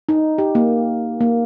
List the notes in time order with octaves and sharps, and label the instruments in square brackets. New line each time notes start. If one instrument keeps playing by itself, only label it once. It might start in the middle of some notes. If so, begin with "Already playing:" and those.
[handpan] D#4
G4
A#3
A#3